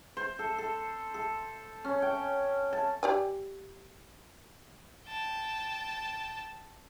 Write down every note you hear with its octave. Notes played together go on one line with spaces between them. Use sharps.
C5
A4
A4
A4
C#4
G5
A5
G4 D5 G#5
G5 A5